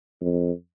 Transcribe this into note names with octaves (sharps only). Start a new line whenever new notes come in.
F2